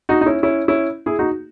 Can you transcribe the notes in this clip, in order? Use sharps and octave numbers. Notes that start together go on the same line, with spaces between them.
D#4 F#4
D#4
C#4 E4
C#4 E4
C#4 E4
E4 G#4
D#4 F#4